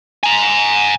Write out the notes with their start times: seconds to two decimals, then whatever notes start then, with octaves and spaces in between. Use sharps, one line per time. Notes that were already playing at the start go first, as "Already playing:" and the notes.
0.24 G#5 A#5